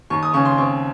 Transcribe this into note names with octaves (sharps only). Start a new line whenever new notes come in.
D#2 C#6
D#6
C#3 C#6
C6
C4 C#6